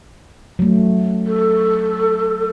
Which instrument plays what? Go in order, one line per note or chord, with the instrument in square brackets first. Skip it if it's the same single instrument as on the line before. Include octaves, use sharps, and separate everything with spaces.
[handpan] F#3 A3
[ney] A4